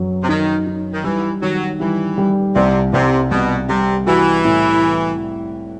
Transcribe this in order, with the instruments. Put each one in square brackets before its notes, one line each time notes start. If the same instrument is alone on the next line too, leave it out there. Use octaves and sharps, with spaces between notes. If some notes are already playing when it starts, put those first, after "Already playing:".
Already playing: [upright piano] F#2 F#3
[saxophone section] C3
[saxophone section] D#3 [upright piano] D#4
[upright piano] D#4
[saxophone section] D#3
[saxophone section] E3 [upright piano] G3
[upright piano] D#3 [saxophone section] F#3
[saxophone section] E3 [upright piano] G3
[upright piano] G3
[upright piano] C2 [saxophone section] C3
[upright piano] C2 [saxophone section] C3
[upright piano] C2 [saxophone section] B2
[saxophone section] C3 [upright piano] G3
[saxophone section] E3 [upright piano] F#4
[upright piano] A2